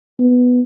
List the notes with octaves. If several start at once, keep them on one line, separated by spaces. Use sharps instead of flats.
B3